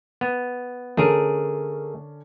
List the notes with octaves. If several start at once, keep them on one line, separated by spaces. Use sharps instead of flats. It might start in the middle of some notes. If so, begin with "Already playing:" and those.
B3
D3 A3 C#4 D4 G#4 A#4